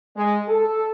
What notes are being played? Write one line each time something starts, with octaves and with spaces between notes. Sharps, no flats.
G#3
A4